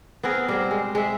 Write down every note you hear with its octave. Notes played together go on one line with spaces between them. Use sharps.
B3 C4 G#4 A#4
G3 C4 A#4 C5
G#3
G#3 E5